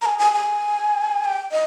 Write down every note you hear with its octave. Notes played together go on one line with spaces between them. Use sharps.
A#5
G#5
G#5
G#5
G5
D#5